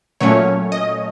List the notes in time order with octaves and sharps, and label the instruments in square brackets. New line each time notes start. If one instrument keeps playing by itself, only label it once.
[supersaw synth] A#2 F#3 A3 C#4 C#5
D#5